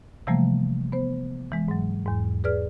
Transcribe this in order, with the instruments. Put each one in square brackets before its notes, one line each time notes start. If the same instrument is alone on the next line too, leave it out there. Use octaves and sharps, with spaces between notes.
[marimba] C3 E3 F3 G3 A3 A#3
B3 C5
E3 G#3
G#2 F#3
E2 G#2
G#4 B4 D5 F6